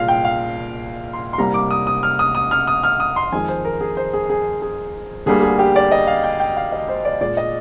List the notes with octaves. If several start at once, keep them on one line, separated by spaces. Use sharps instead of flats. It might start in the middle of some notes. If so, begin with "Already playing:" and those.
Already playing: C2 A#2 G#3 F5
G5
F5
C6
C6
C2 C3 G3 A#3 A#5
D6
D#6
D#6
F6
D#6
D#6
F6
D#6
F6
D#6
C6
F2 D#3 G#3 G#5
C5
A#4
G#4
C5
G#4
G#4
G#4
D2 D3 G3 A#3 G#4
G#4
G4
D5
D#5
F5
G5
G5
F5
D#5
C5
D5
A#2 G#3 D5
D#5